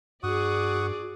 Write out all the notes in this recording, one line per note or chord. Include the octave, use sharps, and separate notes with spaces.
G2 F#4 G#4 D5 F#5 C#6 D#6